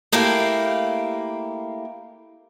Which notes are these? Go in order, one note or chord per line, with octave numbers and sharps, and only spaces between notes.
A3 A#3 E4 G4 F5